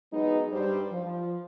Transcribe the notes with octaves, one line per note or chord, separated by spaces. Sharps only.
E3 F#3 G#3 B3 D#4
G2 G3 C5
F3